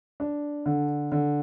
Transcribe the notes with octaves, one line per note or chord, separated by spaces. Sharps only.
D4
D3
D3